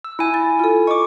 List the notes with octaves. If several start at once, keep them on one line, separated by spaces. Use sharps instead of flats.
E6
E4 G#5
A6
F4 A4
D#5 B5 C#6 D6